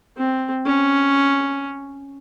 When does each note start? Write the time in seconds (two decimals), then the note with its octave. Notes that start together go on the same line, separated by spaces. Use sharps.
0.17 C4
0.65 C#4